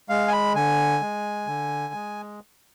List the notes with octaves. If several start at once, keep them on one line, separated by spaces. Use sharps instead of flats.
G#3 F5
G#5
B5
D3 G#5
G#3
D3
G#3